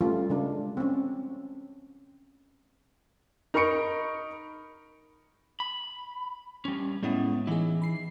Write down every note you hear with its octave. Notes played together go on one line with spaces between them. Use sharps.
G3 A3 C#4 F4
C#3 G#3 D4
C4 C#4
D#4 A#4 B5 C#6 C#7 D7
B5
G3 C#4
A2 G#3 B3 C#4 E4
E3 D#4 E4 G#4
B5 C7